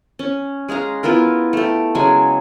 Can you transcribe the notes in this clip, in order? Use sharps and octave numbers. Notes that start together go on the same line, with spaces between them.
C#4
G#3 G#4 F5 A#5
B3 E4 F4 A#4
A3 G4
C#3 F#3 G#3 G#5